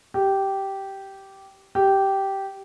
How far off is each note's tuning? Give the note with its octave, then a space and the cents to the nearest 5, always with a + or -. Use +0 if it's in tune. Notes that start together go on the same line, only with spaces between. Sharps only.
G4 -10
G4 -10